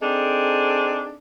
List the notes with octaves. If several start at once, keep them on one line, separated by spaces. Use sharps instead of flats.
C4 D4 D#4 G#4 A4